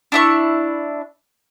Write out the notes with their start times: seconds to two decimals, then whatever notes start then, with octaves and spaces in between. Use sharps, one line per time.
0.12 D4 E4 C#6